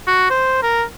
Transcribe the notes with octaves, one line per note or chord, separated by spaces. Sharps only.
F#4
C5
A#4